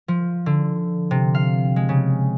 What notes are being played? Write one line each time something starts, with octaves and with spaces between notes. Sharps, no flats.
F3
D3
C3
F5
G#3
C#3